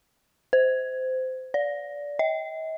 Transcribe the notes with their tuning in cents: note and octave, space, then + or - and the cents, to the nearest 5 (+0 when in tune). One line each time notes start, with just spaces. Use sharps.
C5 -20
D5 -20
D#5 +45